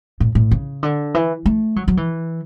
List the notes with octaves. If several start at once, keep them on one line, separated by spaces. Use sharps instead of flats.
A2
A2
C#3
D3
E3
A3
F#3
F#3
E3